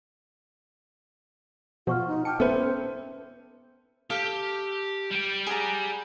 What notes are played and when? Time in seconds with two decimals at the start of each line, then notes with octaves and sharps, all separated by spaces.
1.87 B2 F3 F4 F#5 C#6 F6
2.08 D#4
2.25 G5 A5 D6 F6 C#7
2.40 B3 C#4 A4 B4 C5 E5
4.10 G4 A4 F5
5.11 G3 G5
5.47 G#4 F#5 A#5